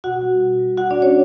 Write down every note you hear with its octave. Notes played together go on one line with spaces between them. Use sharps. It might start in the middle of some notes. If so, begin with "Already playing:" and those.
B2 F#4 F#5
G3
B2
G3
B2 F#4 F#5
D4 D5
G3
C#4 C#5